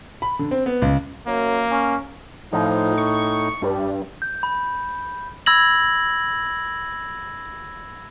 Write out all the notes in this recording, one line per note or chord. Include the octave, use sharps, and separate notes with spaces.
B5
D3
C4
B3
C#2
F#2 A#3
C#4
A2 F3 D#4
C#6
G2 G3
G6
B5
B5 E6 G#6 A#6 F#7